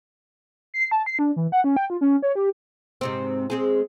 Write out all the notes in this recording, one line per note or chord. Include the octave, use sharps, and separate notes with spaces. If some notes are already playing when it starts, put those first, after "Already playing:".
C7
A5
C7
D4
E3
F#5
C#4
G5
F4
C#4
C#5
G4
G#2 C3 C4
G#3 C4 G#4